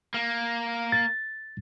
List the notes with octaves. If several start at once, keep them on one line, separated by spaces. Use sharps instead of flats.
A#3
A6